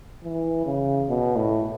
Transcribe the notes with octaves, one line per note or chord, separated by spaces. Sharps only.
E3
C#3
B2
A2